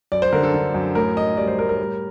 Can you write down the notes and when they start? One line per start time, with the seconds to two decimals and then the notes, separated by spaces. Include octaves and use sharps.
0.12 F#2 D5
0.22 C5
0.32 D3 A#4
0.43 A4
0.54 D3
0.74 F#2
0.95 A2 A#4
1.16 A2 D#5
1.37 G3 D5
1.48 C5
1.58 A2 A#4
1.69 A#4
1.80 G3